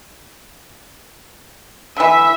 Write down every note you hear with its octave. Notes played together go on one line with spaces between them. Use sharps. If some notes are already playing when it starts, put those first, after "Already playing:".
D3 E3 E5